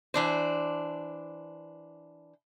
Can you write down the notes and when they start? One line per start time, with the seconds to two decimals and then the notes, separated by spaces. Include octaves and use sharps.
0.14 E3 D4 C5